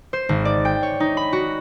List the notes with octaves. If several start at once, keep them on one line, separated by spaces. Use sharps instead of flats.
C5
G#1
D5
G5
C#5
D#4
B5
F#4